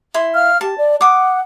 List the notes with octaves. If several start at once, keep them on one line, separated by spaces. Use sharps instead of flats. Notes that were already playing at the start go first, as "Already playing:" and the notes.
E4 C6
F5 F6
G4 A5
D5
F#5 D6 D#6